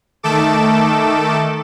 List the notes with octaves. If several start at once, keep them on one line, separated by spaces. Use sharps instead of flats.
D#3 A3 A4 D6 E7